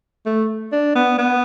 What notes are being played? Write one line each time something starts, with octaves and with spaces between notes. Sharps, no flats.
A3
D4
B3
B3